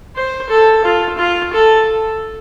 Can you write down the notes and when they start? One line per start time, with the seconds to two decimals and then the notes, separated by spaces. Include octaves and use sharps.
0.16 C5
0.50 A4
0.85 F4
1.18 F4
1.53 A4